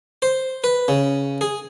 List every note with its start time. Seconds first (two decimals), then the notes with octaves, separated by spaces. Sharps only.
0.22 C5
0.64 B4
0.88 C#3
1.41 G#4